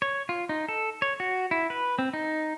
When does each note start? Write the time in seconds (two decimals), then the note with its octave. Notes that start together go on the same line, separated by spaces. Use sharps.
0.02 C#5
0.29 F4
0.49 D#4
0.69 A4
1.02 C#5
1.20 F#4
1.51 E4
1.70 B4
1.99 C4
2.13 D#4